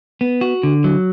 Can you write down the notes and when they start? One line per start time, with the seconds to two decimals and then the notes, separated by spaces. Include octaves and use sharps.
0.21 B3
0.41 F#4
0.63 D3
0.84 F#3